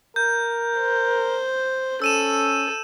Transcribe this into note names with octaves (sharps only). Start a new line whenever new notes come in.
A#4 G6
C5
C#4 A4 E6 D#7 E7